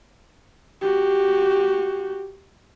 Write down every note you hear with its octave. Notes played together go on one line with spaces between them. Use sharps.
F#4 G4